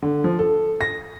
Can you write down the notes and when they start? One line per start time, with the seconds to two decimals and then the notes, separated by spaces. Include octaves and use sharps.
0.02 D3
0.24 F3
0.39 A4
0.81 A#6